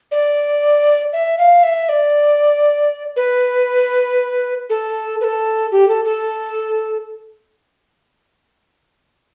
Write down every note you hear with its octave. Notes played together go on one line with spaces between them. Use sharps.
D5
E5
F5
E5
D5
B4
A4
B4
A4
G4
A4
A4